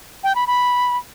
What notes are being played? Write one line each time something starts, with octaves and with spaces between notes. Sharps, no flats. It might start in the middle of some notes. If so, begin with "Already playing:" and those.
G5
B5
B5